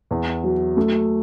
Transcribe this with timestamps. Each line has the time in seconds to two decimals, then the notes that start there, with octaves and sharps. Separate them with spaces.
0.11 E2
0.44 F#3
0.77 A3